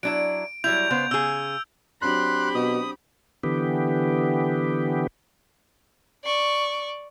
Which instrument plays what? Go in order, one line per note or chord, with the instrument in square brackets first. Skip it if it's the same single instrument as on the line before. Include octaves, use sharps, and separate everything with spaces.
[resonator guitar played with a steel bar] F#3 D4 E4 [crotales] D7
[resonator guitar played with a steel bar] F#3 G3 E4 [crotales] G6 F7
[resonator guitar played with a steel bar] C#3 B3 C5
[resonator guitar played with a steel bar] C#3 G#4 [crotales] E6
[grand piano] F#3 C4 D4 [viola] G4 B5 [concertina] C6 F#6
[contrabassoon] B2 [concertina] D#6
[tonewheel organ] D3 E3 B3 G4
[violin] D5 C#6